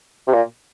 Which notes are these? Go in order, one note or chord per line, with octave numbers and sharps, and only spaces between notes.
C3
A#2